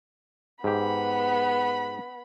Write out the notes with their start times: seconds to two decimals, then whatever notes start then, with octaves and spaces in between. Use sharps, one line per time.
0.64 G#2 B3 G4 B5